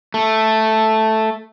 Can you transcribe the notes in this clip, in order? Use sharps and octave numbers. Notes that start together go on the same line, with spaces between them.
A3